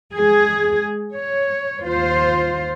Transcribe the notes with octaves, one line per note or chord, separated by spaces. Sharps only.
G#3 G#4
C#5
D#2 F4 C5